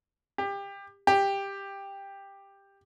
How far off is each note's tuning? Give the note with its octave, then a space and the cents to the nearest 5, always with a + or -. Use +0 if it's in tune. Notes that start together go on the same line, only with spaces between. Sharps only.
G4 +25
G4 +10